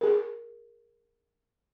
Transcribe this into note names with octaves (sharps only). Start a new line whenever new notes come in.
G#4 A#4